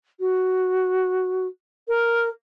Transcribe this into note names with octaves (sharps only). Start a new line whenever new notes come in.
F#4
A#4